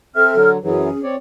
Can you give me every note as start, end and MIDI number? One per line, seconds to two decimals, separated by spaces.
0.16 0.35 60
0.16 0.49 69
0.16 0.35 76
0.16 0.49 89
0.35 0.57 50
0.35 0.57 54
0.64 0.89 42
0.64 0.89 52
0.64 0.89 54
0.64 0.99 61
0.64 0.99 68
1.03 1.16 60
1.03 1.16 73
1.03 1.16 74